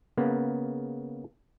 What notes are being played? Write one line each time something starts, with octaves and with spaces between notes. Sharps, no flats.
C#3 A#3 B3